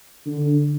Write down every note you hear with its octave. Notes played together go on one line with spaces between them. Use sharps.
D3